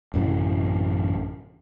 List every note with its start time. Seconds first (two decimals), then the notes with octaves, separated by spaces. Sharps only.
0.14 A1 F#2 C3 E3